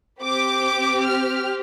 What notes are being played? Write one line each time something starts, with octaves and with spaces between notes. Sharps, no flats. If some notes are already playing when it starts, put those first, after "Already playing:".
C4 G4 D6
F6